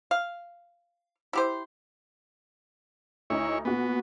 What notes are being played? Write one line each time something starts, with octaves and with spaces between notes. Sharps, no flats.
F5
E4 G4 C5
D2 D#4 E4 C#5
A#2 B3 F#4